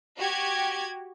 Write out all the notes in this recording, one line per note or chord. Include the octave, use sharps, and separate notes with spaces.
F#4 G4 G#6